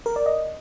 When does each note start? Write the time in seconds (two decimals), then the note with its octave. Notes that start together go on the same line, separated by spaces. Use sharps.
0.06 A#4
0.16 D5
0.26 D#5